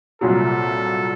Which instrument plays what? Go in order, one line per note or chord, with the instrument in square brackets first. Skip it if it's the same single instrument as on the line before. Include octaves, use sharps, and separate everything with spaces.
[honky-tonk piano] C2 A#2 F#3 [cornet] A4